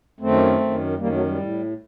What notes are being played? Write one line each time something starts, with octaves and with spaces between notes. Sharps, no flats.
F#2 D#3 A3 C4
F#2 D#3
F#2 D#3 G3 A#3
F#3 A3
G3
A2